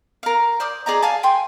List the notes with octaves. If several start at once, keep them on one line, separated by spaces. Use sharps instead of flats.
A#4 F5
C5 D5 D#6
G#4 D5 D#5 A#5
F5 G#5 A5
G5 G#5 C6